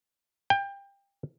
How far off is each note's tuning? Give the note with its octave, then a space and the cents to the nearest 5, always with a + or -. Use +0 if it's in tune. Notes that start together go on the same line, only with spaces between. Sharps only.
G5 +25